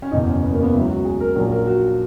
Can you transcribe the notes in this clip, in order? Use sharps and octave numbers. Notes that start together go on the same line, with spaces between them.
C#4
F#1 E2 B2 D#4
C#4
B3
A#3
B3
C#2 C#3 F#3 E4
F#4
G#4
A#4
A#1 A#2 F#3 G#4
A#4
F#4